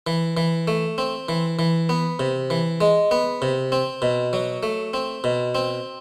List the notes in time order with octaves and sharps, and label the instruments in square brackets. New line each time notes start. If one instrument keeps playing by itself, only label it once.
[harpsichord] E3
E3
A3
C4
E3
E3
B3
C3
E3
G#3
B3
C3
C4
B2
F#3
A3
C4
B2
C4